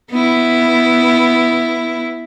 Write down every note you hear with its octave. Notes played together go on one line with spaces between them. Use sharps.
B3 E4